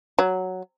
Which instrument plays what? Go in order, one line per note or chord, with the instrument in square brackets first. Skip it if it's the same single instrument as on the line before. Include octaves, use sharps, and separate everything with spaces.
[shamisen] F#3